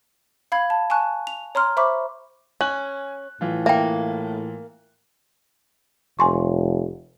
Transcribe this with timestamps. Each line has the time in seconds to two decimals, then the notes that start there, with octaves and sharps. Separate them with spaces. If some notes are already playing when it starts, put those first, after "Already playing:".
0.52 F5 B5 G#6
0.70 A5
0.90 G#5 A5 C#6 F#6
1.27 F7
1.55 C#5 A#5 C6 F6
1.77 C5 E5 B5 C#6 D6
2.61 C#4 G#5 F#6 F#7
3.41 A2 E3 F4
3.66 A#3 E5 G5
6.19 F1 G#5 C6 C#6